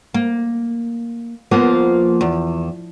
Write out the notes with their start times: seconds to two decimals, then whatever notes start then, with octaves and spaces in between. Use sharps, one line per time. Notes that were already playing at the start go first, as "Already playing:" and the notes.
0.14 A#3
1.51 F3 A#3 B3
2.21 E2